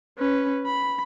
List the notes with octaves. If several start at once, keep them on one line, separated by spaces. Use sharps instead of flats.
C#4 B4
B5